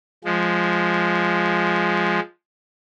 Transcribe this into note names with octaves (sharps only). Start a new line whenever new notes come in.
F3 G#3